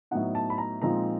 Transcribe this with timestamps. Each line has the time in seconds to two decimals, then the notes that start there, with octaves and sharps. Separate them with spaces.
0.11 A2 F#3 B3 D#4 F#5
0.35 A5
0.50 B5
0.58 A#5
0.82 A#2 F3 G#3 C4 D#4 A#5